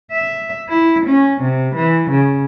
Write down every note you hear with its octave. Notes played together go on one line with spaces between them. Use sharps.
E5
E4
C#4
C3
E3
C#3